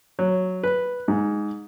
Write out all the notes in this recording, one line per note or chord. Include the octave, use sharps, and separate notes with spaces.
F#3
B4
G#2